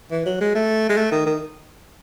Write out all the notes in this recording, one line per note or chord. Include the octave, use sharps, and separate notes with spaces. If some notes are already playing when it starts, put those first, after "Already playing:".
E3
F#3
G#3
A3
G#3
A3
D#3
D#3